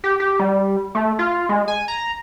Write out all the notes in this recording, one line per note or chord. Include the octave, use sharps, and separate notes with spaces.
G4
G4
G3
A3
F4
G#3
G#5
A#5